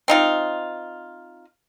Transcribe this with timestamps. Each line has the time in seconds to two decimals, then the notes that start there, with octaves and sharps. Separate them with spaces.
0.08 C4 D#4 F4